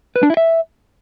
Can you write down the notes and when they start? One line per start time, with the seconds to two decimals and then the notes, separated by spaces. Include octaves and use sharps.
0.16 B4
0.23 D4
0.30 E4
0.37 E5